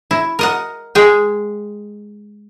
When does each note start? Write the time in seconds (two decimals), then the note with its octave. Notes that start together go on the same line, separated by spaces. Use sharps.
0.11 E4
0.39 A#4 D#5 F#5
0.95 G#3 G#4 G5